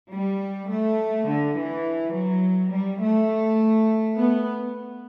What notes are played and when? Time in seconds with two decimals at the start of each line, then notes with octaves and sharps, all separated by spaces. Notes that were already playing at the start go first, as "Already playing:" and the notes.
0.12 G3
0.70 A3
1.28 D3
1.57 E3
2.14 F#3
2.72 G3
3.01 A3
4.17 B3